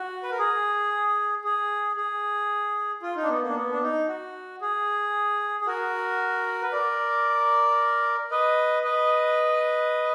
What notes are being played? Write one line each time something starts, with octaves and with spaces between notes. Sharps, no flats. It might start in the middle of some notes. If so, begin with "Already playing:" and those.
Already playing: F#4
B4
A#4
G#4
G#4
G#4
F4
D#4
D4
B3
A#3
D4
B3
D4
D#4
F#4
G#4
G#4
F#4 A#4
B4
A#4 D5
B4 D#5
B4 D#5